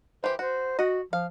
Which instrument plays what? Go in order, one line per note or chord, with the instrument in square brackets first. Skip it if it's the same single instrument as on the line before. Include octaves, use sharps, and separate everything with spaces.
[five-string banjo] E3 G4 [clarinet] C5
[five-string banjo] F#4 [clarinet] C5
[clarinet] F#4 [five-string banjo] D#5 F#5
[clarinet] F3 [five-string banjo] F5